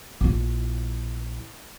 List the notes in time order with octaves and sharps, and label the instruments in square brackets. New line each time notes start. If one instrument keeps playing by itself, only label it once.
[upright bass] A#1 E4